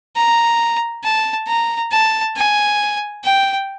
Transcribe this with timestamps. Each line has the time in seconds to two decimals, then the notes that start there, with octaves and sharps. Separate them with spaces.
0.16 A#5
1.04 A5
1.48 A#5
1.92 A5
2.36 G#5
3.24 G5